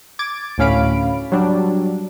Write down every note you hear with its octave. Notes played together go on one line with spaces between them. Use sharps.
D6 G#6 A6 D7
D2 A2 C#4 F5 B5 D7
F#3 G3 D4